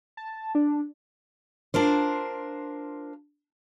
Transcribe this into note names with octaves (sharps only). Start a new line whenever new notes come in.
A5
D4
D4 F4 A#4 C5